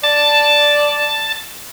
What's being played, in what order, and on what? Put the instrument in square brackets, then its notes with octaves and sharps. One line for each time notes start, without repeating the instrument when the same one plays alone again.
[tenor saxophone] D5 [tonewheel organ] A5